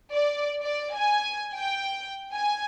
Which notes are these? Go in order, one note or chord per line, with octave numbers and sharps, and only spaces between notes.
D5
D5
G#5
G5
G#5